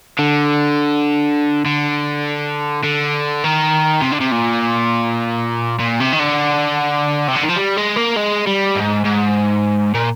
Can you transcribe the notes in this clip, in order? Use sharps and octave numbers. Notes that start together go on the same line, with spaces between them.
D3
D3
D3
D#3
C3
D3
C3
A#2
A#2
C3
D#3
D3
C3
D3
D#3
F3
G3
G#3
A#3
G#3
G3
G#2
G#2
A#2